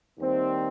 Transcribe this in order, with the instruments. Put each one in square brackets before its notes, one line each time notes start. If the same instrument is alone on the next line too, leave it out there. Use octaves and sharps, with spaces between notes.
[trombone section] D#2 D#3 G3 C4